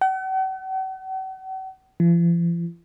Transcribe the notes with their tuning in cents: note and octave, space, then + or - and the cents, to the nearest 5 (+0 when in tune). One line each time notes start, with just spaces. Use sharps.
F#5 +45
F3 -45